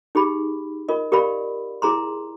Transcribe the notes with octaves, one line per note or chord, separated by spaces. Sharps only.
D#4 G4 G#4 B5
F4 A#4 D#5
G4 A#4 D5 F5 B5
E4 G#4 A#5 C6